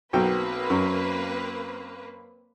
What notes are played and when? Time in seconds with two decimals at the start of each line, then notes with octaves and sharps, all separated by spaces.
0.13 B1 F#3 A#3 C4 B4 G5
0.70 F#2